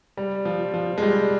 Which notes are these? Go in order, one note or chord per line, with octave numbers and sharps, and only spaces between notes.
G3
F3
F3
G#3
G3